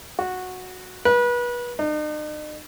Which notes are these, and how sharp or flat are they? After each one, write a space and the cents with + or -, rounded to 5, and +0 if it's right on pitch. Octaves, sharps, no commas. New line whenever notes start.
F#4 -10
B4 -30
D#4 -45